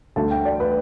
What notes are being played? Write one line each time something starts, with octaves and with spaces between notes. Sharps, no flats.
D2 D3 A3 A5
G5
D5
B4